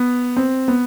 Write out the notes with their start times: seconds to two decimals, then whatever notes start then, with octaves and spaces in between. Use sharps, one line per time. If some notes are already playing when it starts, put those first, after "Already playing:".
Already playing: B3
0.37 C4
0.68 B3